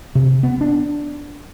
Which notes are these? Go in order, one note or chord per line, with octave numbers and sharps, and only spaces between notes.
C3
B3
D4